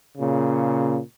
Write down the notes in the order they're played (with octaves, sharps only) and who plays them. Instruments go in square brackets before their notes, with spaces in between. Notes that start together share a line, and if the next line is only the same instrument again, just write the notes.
[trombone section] A#2 C#3